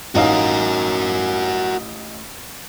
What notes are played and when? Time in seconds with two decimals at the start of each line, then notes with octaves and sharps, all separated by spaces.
0.15 A1 D#4 F#4 A#4 F5